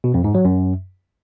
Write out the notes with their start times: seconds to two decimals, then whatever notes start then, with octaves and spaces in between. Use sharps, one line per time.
0.04 B2
0.14 F2
0.24 G#2
0.35 F#3
0.45 F#2